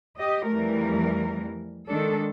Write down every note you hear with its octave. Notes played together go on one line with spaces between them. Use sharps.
G4 D#5
F2 E3 G3 A3 A#4
D#3 G#3 D4 A4